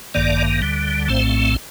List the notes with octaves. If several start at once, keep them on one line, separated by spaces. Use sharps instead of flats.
A1 G2 D#3 A#3 D5
D2 D3 G3
A#1 A2 A3 C4 C5